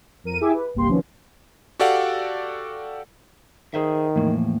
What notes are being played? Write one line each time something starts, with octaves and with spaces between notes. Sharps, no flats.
F2 A#4 D#7
E4 G4 G#4 E5 G#5 D6
B4
G1 C2 A#3 G4 C6
C3 D#3 F3 B3 C#4
F#4 G4 A4 D5 F5 F#5
D#3 G#4 C5 E5
E2 A2 F3 A#3